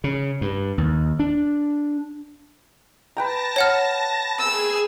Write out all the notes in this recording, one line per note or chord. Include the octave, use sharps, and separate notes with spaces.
C#3
G2
D#2
D4
B4 G5 A5 A#5 A#6
C#5 F#5 F6
G#4 G#5 E6